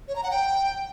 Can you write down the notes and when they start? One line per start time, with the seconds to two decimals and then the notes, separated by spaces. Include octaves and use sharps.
0.08 C#5
0.16 A#5
0.23 F#5
0.31 G5